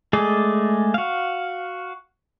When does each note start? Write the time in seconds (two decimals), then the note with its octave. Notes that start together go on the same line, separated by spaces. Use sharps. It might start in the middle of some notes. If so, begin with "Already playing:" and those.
0.13 G#3 A3 G#4 D5
0.94 F#4 F5